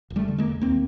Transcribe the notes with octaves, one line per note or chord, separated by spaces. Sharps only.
E1
G3 A3
D3
G#3 A#3
E1
D#2 A#3 C4